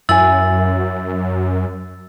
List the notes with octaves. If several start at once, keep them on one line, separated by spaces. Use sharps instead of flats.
F#2 E4 G#5 E6 A6 F#7